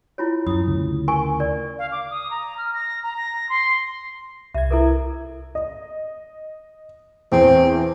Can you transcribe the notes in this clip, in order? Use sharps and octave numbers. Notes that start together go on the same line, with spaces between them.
E4 F4 C#5
F#2 E4 D#6
D2 C#3
A#4 G#5 C#6
A#4 D5
F5
D6
D#6
A#5
F6
A#6
A#5
A#6
C6
C2 E5 G#6
E4 A4 A#4
D#5
E2 C4